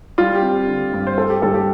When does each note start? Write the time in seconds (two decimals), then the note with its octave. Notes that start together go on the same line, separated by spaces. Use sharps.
0.18 G3 F4
0.35 G4
0.42 C4
0.67 D3
0.93 G2
1.07 C5
1.17 A3 A4
1.30 G4
1.42 G2 A4
1.54 G4